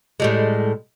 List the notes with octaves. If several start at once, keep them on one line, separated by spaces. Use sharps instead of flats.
A2 G3 G#3